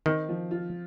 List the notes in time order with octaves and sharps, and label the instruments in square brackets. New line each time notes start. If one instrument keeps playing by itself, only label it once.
[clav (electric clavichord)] D#3 [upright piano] C4
[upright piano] F3
F4